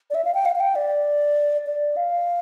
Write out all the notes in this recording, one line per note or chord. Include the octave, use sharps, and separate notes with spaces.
D5
E5
F5
G5
F5
F5
G5
D5
D5
F5